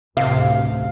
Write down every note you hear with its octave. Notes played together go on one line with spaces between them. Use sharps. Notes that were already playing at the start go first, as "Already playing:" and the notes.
A1 D2 C3 F5